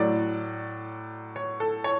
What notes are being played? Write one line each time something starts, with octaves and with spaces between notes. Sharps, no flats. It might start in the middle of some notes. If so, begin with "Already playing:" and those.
Already playing: A2 F#3 D5
C#5
A4
C#5